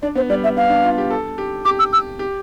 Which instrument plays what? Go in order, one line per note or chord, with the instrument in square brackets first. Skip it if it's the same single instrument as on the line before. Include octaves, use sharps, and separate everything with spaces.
[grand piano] D4 [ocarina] D5
[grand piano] B3 [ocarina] C5
[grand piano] G3 [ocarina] D5
[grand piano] B3 [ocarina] E5
[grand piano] B3 [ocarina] F5
[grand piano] D4
F4
G4
A4
G4
[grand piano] G4 [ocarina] D6
[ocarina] E6
E6
[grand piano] G4